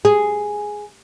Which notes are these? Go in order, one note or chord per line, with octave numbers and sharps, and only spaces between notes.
G#4